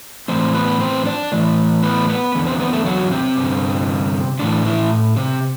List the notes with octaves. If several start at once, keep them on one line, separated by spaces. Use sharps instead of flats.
A2 E3 C4 C5
B3 B4
C4 C5
D4 D5
A2 E3
B3 B4
B3 B4
E2 D3
C4 C5
B3 B4
A3 A4
F#3 F#4
C3 C4
G2 D3
A2 D3 E3 D4
E3 E4
C3 C4